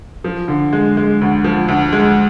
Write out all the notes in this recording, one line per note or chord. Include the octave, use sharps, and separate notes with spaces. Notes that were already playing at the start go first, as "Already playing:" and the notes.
F3
D3
G#3
G#3
D2
F3
D2
G#3